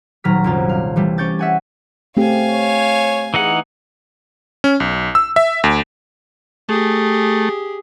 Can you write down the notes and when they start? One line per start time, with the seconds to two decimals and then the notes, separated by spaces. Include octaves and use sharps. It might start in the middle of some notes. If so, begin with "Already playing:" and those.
0.24 D#1 F#3 A#5 F6 B6
0.44 C2 F#2 F4
0.69 F5
0.96 E3 G3 A3
1.18 C#4 G4 C#5 G6 A6
1.39 E5 F#5 G#5
2.17 C#3 A3 C4 G4 F5 G#5
2.49 C#5
3.34 E3 D#4 G#4 F#5
4.64 C#4
4.80 B1
5.15 E6
5.36 E5
5.64 D2
6.69 A3 G4 G#4